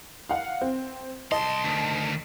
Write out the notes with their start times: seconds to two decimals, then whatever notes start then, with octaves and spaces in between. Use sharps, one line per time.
0.29 F5 F#5
0.61 C4
1.32 C2 D#5 A5 C6
1.64 D2 D#3